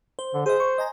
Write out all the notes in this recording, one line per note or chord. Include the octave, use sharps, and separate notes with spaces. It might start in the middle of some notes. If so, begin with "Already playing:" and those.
C5
D3
G#4 C5 D#5
C#6
D#5 G#5 A#5